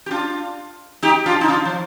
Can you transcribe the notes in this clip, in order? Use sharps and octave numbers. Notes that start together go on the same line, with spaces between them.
G4
D4 F4
D#4 G4
D4 F4
D#4
D4 F4
F3